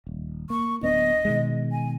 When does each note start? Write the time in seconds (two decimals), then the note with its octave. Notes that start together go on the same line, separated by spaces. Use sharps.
0.07 D#1
0.50 A#3 C#6
0.83 D1 B3 D4 D#5
1.25 B2 D#3 G#3
1.72 G#5